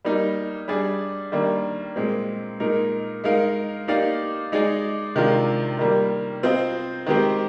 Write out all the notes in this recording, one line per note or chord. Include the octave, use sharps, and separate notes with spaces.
G3 A#3 D#4
G3 D4 G#4 D5
D#3 G3 A#3 D4
A#2 G#3 C4
A#2 G#3 D#4 A#4
G#3 D#4 A#4 F5
A#3 D#4 G4 D5 F5
G#3 D#4 G#4 D5
C3 D#3 G#3 D4 F4
D#3 G3 A#3
C4 F4 C5 D#5
D#3 G#3 C4 G4 C5